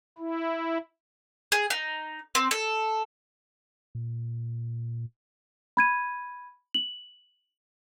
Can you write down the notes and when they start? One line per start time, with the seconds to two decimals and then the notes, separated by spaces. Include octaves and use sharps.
0.18 E4
1.52 G#4
1.70 D#4
2.35 C4
2.51 A4
3.95 A#2
5.77 B5 G#6 D#7
6.74 F#7